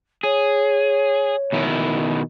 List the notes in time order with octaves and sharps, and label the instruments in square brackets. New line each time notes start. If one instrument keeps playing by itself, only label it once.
[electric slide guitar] G#4 [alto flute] C#5
[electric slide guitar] B2 D#3 E4